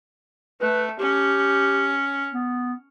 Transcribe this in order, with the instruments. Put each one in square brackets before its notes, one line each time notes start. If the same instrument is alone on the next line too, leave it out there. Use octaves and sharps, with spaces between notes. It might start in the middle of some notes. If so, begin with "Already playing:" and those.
[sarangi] A3 [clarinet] B4
[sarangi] C#4 [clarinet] G4
[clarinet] B3